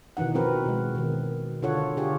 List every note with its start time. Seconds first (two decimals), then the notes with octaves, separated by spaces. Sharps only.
0.17 B2 D#3 E3 D#4 F#5
0.35 F3 C4 F#4 A#4 B4
0.65 B2 G#3
0.95 B2 D#3
1.62 D3 F4 A4 C#5 F#5
1.97 D3 F4 G4 G#4 C#5